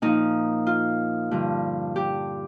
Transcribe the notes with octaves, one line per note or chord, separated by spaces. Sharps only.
A#2 F3 D#4
F4
G2 D3 F3
G4